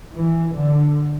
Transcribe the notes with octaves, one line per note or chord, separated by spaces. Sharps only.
E3
D3